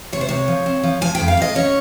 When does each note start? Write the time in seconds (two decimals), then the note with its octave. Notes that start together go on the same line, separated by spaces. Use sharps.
0.12 C3 C#5
0.21 C5
0.29 C3 C#5
0.48 F3
0.66 C4
0.83 F3
1.01 F3 G#5
1.15 F2 G5
1.28 F5
1.37 F2 D#5
1.55 C#4 C#5